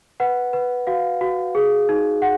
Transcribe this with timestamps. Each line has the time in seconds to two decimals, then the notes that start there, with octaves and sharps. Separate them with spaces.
0.20 B4 F#5
0.53 B4
0.87 F#4 F5
1.21 F#4
1.55 G#4
1.89 D#4
2.22 F#5